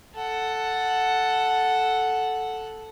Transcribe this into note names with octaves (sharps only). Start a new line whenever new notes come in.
A4 F#5